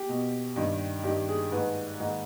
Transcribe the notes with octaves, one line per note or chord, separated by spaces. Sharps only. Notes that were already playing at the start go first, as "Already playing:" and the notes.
Already playing: G4
B2
G2 D#3
G2 D#3 G4
G#4
G#2 D#3 B4
G#2 D#3